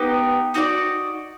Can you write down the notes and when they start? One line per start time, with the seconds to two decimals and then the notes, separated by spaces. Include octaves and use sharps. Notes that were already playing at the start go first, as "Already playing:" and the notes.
Already playing: B3 D#4 G4
0.54 D#4 F#4 A4 D5